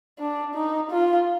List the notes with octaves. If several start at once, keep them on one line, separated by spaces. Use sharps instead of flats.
D4
D#4
F4